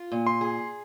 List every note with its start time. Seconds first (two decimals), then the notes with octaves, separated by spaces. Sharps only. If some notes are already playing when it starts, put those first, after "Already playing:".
Already playing: F4
0.12 A#2
0.27 C6
0.41 G#4